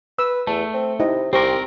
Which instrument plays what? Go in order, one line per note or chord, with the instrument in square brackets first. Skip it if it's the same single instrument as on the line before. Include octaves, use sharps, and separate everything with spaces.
[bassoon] B4 [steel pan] E6
[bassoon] E2 [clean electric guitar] A3 [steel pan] A5
[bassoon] C4
[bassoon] C3 [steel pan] D#4 E4 D#5
[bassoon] C2 [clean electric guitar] C4 A#4 [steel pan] G4 C5 C#6